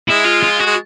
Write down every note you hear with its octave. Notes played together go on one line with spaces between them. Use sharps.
G#3 E4
F4
F4
F#4
G#3